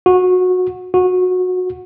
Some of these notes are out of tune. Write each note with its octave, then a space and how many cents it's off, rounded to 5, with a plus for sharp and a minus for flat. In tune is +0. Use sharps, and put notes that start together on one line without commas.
F#4 -20
F#4 -20